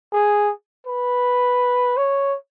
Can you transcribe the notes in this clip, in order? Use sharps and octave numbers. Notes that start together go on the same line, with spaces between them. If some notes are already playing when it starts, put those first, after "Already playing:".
G#4
B4
C#5